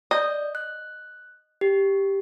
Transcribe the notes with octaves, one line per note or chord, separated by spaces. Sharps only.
D5 D#5 G6
F#6
G4